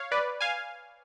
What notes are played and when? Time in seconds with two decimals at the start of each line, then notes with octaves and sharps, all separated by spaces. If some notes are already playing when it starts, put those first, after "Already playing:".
Already playing: C#5 F5
0.12 B4 D5
0.41 F5 G#5